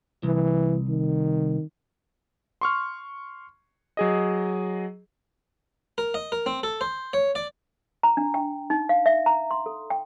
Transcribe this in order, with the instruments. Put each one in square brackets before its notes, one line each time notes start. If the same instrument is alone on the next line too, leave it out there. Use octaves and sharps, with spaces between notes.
[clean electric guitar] C2 [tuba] E3
[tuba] D#3
[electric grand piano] C6 C#6 F6
F#3 G#4 D#5
[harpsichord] A#4
D#5
A#4
C4
A4
C5
C#5
D5
[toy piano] A#5
D4
G5
D#4
F5
E5
A#5
C6
A4
G5